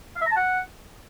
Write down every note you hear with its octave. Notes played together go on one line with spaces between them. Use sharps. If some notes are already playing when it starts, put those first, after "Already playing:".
F5
E5
A#5
A5
F#5